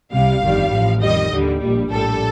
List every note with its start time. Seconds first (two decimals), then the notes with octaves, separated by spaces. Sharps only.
0.13 C2 C3 G3 F5
0.42 G1 F2 D#3 G3
0.72 A1 A2 F3
1.01 F2 D#3 G3 D#5
1.31 D#2 D3 G3
1.61 A#1 A#2 G3
1.90 A#1 A2 G3 A4